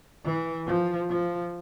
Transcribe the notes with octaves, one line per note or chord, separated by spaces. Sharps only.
E3
F3
F3